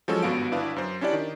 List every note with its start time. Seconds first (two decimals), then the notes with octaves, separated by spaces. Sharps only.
0.08 F3 F#3 G#3 C#4 F#4 A4
0.22 G#1 G2 B3 F#4 F5 D7
0.52 G1 D4 E4 B4 F5
0.76 F#2 C5
1.01 C#4 D4 E4 G4 D5
1.13 D#3